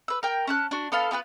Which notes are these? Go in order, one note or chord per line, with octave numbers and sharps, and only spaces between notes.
B4 E6
A#4 G5
C#4 A5 F#6
D4 F#4
B3 A4 F5
B3 F4 F#4 B4